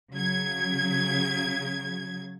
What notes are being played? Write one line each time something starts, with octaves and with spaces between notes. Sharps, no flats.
C#3 F#3 G#6